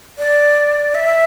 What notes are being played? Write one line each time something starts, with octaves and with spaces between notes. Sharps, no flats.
D5
E5